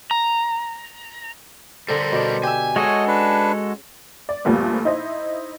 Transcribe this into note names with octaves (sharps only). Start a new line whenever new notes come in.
A#5
D3 G3 A4 A#4 C5
B2 D4
G4 E5 G#5
G#3 C#4 F#4 G#4 A4 C#5 D#5
D4 B4
D5
D2 A#2 F3 G3 A3 B3
D#4 E4 C5 D#5